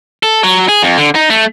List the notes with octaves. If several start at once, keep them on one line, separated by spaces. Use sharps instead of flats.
A4
F#3
G#4
F2
D3
D#4
A3